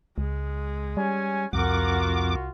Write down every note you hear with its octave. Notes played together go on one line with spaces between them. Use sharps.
C#2 G#3
G3 C#4 G#5
C2 F2 F4 F#4 A#4 F#5 D6